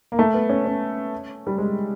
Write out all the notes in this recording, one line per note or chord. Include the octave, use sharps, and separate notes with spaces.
A#3
A3
B3
C#4
C#4
G3
G#3